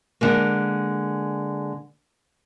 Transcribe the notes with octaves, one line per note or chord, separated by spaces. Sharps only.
D3 G#3 A#3